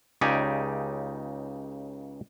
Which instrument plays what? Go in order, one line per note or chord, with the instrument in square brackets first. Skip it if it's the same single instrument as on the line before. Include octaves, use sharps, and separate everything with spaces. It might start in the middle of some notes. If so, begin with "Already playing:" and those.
[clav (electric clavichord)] C#2 C#3 D#4 G4 D5 G#5